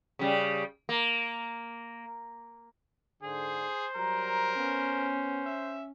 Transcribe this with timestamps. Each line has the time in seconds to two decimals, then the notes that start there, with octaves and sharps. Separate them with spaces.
0.19 C#3 G3
0.89 A#3
3.23 G#2 D3 G#4 C5
3.96 F#3 G3 A#4 A#5
4.57 B3 C#4
5.46 E5